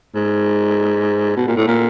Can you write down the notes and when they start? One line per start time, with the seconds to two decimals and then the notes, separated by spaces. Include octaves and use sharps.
0.15 G#2
1.36 B2
1.47 A#2
1.57 A2
1.67 A#2